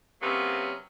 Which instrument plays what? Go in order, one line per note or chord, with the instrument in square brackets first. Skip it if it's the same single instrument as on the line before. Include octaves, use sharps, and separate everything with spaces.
[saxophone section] C3 F#3 A#3 B3 C#4